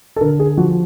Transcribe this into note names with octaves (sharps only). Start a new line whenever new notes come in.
A4
D3 A#4
G#4
F3 F#4